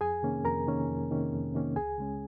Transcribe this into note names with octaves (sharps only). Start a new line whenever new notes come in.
F2 G#4 G#5
C3 D#3 A#3 C#4
F2 A#4 A#5
C3 D#3 A#3 C#4
F2
C3 D#3 A#3 C#4
F2
C3 D#3 A#3 C#4
C#2 G#4 G#5
C#3 G#3 C#4